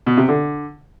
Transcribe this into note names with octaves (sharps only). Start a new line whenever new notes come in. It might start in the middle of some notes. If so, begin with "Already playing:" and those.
B2
C3
D3